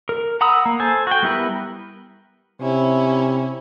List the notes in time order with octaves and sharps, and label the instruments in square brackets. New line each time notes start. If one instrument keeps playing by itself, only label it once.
[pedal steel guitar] A#4
F#5 A#5 B5 D#6 E6
A#3
A4 C5 G#5
F#4 G5
G3 B3 E4 A#4 B4
[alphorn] C3 [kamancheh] C#4 E4